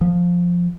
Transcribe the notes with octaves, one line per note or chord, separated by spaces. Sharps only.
F3